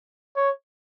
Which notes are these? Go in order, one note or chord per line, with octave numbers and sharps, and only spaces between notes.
C#5